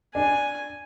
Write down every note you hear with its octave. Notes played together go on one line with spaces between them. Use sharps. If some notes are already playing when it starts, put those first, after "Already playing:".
D4 G#5